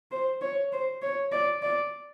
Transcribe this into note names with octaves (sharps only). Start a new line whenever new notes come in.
C5
C#5
C5
C#5
D5
D5